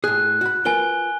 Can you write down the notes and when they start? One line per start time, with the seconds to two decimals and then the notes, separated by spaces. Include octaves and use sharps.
0.04 A2 G#4 F#6
0.41 F#4 B5
0.65 F4 A#4 B4 G#5 G7